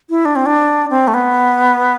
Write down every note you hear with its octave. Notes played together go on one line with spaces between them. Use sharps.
E4
D4
C4
D4
C4
A3
B3